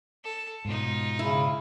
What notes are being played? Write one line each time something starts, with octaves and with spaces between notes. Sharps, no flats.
A4
G#2 B2 D#4 F4
C#3 E4